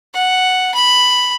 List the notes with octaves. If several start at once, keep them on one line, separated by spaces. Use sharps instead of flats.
F#5
B5